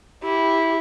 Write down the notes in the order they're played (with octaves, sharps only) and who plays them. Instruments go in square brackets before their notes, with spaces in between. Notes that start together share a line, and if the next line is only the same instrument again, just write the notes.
[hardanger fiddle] E4 [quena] G4